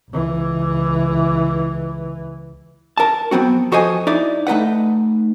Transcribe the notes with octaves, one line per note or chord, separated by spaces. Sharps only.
C#2 E3
A#4 A5
F#3 B3 C4 F#4
F2 F#4 A4 C5 D#5 G#5
D#4 E4 D5
A3 D#4 B4 F#5